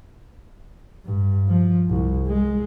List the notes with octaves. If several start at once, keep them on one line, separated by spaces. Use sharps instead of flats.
G2
F3
C2
G#3